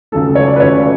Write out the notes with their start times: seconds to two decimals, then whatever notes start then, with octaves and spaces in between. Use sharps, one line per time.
0.12 C#2 C#3 F#3 A3 A4
0.35 C#5
0.47 D5
0.56 B4
0.60 C#2 C#3 F#3 A3 C#5